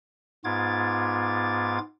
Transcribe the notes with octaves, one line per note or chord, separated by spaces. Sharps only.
G#2 B3 F4 D6 G#6 A6